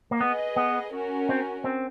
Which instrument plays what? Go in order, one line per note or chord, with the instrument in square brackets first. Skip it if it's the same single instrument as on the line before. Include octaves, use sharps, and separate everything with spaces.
[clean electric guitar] A#3
[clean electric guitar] B3 [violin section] G#4 B4 D#5
[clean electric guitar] B3
[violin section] C#4 F#4 A#4
[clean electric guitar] C4
C4